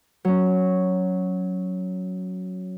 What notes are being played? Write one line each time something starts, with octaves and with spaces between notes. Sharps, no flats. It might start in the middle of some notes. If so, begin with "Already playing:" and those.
F#3 C#4